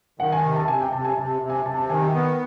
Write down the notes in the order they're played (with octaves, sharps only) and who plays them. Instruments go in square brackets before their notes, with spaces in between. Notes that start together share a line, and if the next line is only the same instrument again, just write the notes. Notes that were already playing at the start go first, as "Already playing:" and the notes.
[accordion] D#3 [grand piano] F#5
[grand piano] G#5
[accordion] C3
[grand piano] A5
[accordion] C3 [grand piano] G#5
[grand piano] G5
[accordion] C3 [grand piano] A5
[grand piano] G#5
[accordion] C3 [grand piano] A5
[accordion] C3
[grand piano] G#5
[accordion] C3 [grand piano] A5
[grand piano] A5
[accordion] D#3 [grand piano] G#5
[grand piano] G5
[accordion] B3